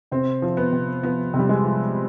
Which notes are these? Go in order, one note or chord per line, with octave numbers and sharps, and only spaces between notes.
C3 C4
F3
B3
C3
F3 B3
C3
G3
G#3
F3